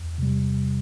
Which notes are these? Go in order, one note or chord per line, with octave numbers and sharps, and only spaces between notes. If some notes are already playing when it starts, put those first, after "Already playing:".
Already playing: E2
C3 G3